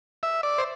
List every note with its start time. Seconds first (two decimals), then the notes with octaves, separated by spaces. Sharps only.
0.23 E5
0.43 D5
0.58 C5